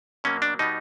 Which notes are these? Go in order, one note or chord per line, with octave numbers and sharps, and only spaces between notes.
B2 F#3 A#3 C#4
D4
B2 G3 B3 D#4